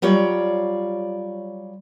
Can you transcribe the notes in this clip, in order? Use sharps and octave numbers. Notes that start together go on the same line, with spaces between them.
F#3 G3 F4 C#5 D5